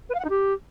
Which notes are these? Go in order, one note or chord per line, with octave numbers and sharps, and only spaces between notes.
B4
F5
F#5
D#4
G4